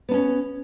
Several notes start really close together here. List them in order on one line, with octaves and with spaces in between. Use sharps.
B3 D4 C#4